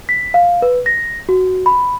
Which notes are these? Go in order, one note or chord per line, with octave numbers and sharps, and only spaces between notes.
B6
F5
B4
A#6
F#4
B5